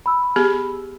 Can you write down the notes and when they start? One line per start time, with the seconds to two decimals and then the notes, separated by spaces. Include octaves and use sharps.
0.06 B5 E6
0.36 B3 G4 G#4